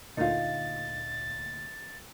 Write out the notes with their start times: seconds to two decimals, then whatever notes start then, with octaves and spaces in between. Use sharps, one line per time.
0.17 D2 A#2 D#4 F4 A6